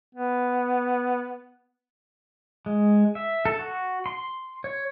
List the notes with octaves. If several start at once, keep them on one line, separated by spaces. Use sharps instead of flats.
B3
G#3
E5
A4
F#4
C6
C#5